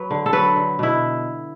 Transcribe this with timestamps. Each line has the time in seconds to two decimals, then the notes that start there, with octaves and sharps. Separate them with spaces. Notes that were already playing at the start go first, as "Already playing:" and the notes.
Already playing: F#3 B4
0.11 D3
0.26 A4
0.33 F#3 B4
0.56 D3
0.79 B2 E4